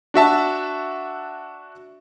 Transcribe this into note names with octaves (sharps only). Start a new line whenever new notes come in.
D4 F#4 E5 A5